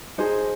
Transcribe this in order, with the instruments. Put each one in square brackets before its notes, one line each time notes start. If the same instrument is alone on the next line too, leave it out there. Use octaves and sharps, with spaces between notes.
[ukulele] D#4 G#4 C5